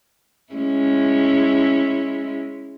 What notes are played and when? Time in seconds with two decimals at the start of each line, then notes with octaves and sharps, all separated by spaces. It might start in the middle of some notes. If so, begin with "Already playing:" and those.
0.53 G#3 C#4 E4